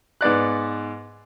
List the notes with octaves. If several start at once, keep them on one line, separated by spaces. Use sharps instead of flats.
G#2 B3 D5 F#6